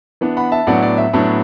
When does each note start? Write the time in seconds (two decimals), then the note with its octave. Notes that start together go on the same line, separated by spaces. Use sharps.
0.21 E3 B3 D4
0.37 F#5 B5
0.52 E5 A5
0.67 A2 F#3 B3 D4 D5 F#5
0.83 D5
0.98 E5
1.13 A2 F#3 B3 D4